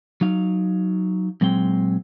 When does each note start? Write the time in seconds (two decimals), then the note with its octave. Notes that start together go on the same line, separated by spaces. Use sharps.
0.21 F#3 D#4 F5
1.41 A#2 F#3 G#3 C4 G5